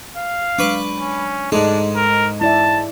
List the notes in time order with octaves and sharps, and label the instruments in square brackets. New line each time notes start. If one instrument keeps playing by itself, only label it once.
[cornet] F5
[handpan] F#3 G#3 D4 [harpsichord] B4 C#6 D6
[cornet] C#4
[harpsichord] G#2 G#3 [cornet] D4 [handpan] D#4 A4
[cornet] A#4
[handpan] E4 D5 E5 [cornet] A5